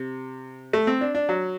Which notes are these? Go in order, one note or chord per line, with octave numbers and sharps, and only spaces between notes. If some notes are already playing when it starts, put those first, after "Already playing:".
Already playing: C3
A3
C4
D4
D4
F#3